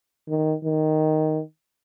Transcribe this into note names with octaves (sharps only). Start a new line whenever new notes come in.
D#3
D#3